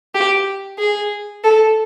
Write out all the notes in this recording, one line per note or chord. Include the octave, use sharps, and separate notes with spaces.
G4
G#4
A4